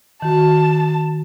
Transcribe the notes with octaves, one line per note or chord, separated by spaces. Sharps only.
D#3 F#4 A5